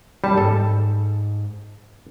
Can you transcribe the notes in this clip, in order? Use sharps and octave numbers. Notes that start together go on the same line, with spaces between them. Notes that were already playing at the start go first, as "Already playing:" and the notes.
D#2 G3 A5
G#2 A4